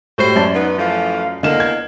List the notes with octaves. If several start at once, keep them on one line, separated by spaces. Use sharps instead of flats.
A2 G3 F#4 C5
F#2 C#5 D5 A5
B3 D#4
E3 F3 A3 F5
E2 D3 A#3 D#5 E7
G#6